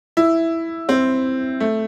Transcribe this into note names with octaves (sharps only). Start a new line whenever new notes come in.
E4
C4
A3